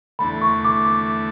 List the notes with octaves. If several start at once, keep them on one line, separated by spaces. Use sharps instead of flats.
E2 D3 A3 B5
C#6
D6
D6